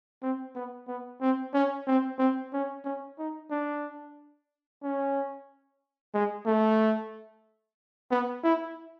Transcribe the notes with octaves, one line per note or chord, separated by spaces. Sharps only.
C4
B3
B3
C4
C#4
C4
C4
C#4
C#4
D#4
D4
C#4
G#3
A3
B3
E4